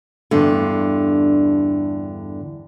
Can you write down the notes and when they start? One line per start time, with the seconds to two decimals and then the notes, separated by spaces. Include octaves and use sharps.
0.31 E2 G2 D3